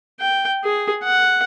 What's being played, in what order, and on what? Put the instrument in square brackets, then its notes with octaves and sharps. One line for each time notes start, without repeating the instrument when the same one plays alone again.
[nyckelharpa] G5
G#4
F#5